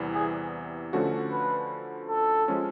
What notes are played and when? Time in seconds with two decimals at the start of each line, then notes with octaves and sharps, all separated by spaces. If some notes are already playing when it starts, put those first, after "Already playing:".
Already playing: E2 C3 E3 G3 B3
0.15 G#4
0.93 D3 F3 A3 C#4 F#4
1.31 B4
2.09 A4
2.48 F3 G#3 C#4